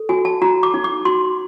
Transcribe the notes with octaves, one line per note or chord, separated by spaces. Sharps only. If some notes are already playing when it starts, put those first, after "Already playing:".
Already playing: A4
F#4 G#5
A5
F#4 A#5
D6
D#4
D6
F#4 C6